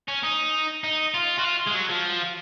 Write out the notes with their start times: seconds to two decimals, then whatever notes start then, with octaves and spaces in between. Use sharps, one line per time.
0.08 C#4
0.23 D#4
0.84 D#4
1.14 F4
1.38 F#4
1.44 F4
1.67 G#3
1.74 F#3
1.89 F3